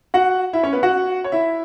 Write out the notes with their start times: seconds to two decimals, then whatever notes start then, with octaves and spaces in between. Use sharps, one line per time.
0.14 F#4 F#5
0.53 E4 E5
0.63 C#4 C#5
0.73 B3 B4
0.83 F#4 F#5
1.24 C#5
1.32 E4 E5